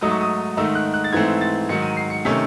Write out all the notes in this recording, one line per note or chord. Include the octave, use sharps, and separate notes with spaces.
G#2 F#3 A3 D#4 D#6
C#6
D#6
G#2 D#3 A3 D#4 E6
F#6
F#6
A6
G#2 E3 A3 C4 G#6
A6
G#2 D#3 F#3 C#7
D#7
C7
C#7
C3 D#3 A3 C#4